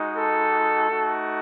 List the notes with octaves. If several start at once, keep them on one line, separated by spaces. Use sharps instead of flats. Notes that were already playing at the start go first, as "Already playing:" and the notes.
Already playing: G#3 D#4 F#4
A4
A3 D#4 F#4